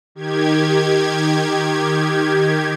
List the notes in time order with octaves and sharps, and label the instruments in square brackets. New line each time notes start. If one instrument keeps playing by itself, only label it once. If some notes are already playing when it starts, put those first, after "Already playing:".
[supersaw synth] D#3 G4 G#6